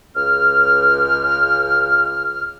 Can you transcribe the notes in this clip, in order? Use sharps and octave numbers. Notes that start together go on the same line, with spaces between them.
C#2 F6